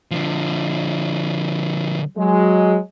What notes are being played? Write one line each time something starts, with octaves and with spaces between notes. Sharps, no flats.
D3 F3
F#3 G#3